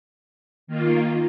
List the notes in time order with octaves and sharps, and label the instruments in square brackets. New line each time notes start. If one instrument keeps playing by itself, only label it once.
[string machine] D#3 A#3 F4